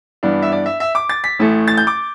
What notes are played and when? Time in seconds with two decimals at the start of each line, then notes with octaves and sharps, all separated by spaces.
0.23 G2 E3 B3 D4
0.42 E5
0.52 D5
0.66 E5
0.80 E5
0.95 D6
1.09 A6
1.24 B6
1.39 A1 A2 A3
1.68 A6
1.77 G6
1.87 D6